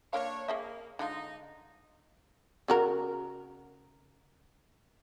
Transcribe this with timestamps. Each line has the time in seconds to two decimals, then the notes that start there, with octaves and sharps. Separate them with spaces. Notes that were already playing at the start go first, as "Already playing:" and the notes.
0.13 A#3 D4 A#4 C#5 F5
0.48 A#3 G#4 D#5 E5
0.99 D3 G#3 D#4 F4
2.68 C#3 F#4 A#4